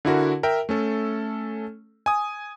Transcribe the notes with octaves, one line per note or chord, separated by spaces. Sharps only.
D3 E4 F#4 A#4
A#4 E5 G5
A3 C#4 A4
G#5 D#6